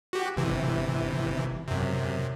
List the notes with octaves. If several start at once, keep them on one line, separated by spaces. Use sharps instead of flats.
F#4 G4
G1 C3 E3
F#2 C3